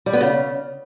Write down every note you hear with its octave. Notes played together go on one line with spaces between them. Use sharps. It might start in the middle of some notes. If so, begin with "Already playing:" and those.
G3
B3
C#3